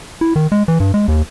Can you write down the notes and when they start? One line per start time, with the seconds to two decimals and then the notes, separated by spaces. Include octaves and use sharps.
0.21 E4
0.36 D#3
0.52 G#3
0.68 E3
0.80 G2
0.94 G#3
1.08 D#2